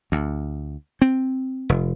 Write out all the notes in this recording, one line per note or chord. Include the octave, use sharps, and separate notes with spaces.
D2
C4
F1